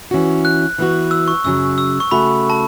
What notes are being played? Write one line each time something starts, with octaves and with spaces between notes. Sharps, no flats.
E3 C#4 F#4
F#6
E3 B3 F#4
E6
C#6
F#2 C#3 F#3 E6
E6
C#6
C#3 A3 F#4 B5
A5